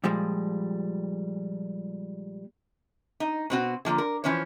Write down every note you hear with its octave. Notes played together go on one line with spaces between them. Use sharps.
A#2 F3 G3 G#3
D#4
B2 C4 F#4
D3 F3 A3 A#3
A#4
E3 F3 C#4 C5 C#5